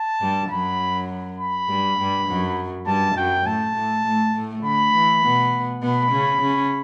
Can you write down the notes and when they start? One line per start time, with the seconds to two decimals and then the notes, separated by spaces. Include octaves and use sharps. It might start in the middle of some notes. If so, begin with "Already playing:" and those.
Already playing: A5
0.21 G2 G3
0.50 F#2 F#3 B5
1.39 B5
1.68 G2 G3
1.98 G2 G3
2.28 F#2 F#3
2.86 G2 G3 A5
3.16 F#2 F#3 G5
3.46 A2 A3 A5
3.75 A2 A3
4.05 A2 A3
4.34 A2 A3
4.64 D3 B5
4.93 E3
5.23 B2 B3
5.82 B2 B3 B5
6.11 C#3 C#4
6.41 C#3 C#4